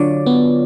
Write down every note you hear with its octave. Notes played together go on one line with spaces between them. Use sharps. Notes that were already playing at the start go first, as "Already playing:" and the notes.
Already playing: D3 F#3 F4 C#5 D5
B3